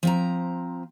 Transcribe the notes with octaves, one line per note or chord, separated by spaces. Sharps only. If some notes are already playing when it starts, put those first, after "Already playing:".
F3 C4 A#5